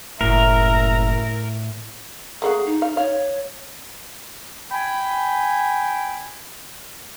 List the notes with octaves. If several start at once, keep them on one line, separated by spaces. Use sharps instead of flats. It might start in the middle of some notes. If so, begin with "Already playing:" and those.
F#1 A2 A#4 E5 A#5
A3 A#3 F#4 G#4
D#4
F5
C#5 F5
G5 G#5 B5